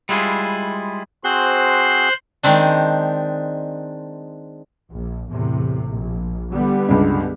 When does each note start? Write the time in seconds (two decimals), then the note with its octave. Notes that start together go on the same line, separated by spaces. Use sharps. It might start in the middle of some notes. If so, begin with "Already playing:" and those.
0.09 G3 G#3 E4 F4 G#4
1.24 C4 F#4 G#4 C5 C6 F#6
2.43 D#3 G#3 C4 D4
4.91 A#1
5.31 E2 A2 C3
5.88 A#1
6.51 D3 G3 B3
6.89 C#2 G2